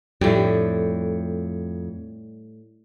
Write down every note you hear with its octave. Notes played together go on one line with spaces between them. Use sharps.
F2 A2 G3